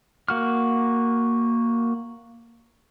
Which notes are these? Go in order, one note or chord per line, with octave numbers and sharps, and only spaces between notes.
A#3 F#4 F6